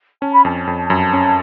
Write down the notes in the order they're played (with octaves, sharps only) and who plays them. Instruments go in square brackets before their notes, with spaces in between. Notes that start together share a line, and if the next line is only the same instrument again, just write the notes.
[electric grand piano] C#4 [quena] A5
[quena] B5
[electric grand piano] F2 [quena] A5
[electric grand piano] F2
[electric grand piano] F#2 [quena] A5
[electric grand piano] C#4